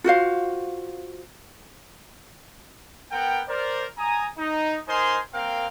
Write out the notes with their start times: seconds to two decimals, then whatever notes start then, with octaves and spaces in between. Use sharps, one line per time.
0.04 F4 F#4 C5 F5
3.12 B3 A#4 F#5 G5
3.48 A#4 C5 D5
3.98 G#5 A#5 D#6
4.38 D#4
4.88 D#4 A#4 C5 D#5 G#5 C6
5.34 A#3 C4 A#4 F5 G5